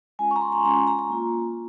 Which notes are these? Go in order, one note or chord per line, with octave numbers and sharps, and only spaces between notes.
G#3 C#4 F4 G#5
C#6
A#5
C6
A#5
G#3 C#4 F4 A#5
A#5
A#5
A#5
A#3 F4